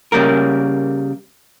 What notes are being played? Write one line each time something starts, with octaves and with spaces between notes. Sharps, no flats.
C#3 G3 A#3 A#4